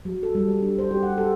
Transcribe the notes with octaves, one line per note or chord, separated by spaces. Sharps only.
F#3
A4
G3
G3
D4
C5
G4
F#5
A4